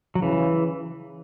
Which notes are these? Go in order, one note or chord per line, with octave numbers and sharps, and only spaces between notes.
F#3
C#3 E3